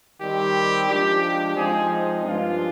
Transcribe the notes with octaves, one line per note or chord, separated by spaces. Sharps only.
D#3 G3 C4 G4
F3 G#3 D4 G4
G4
F3 G#3 C4 D#4 G#4
G2 F3 G#3 D4 F4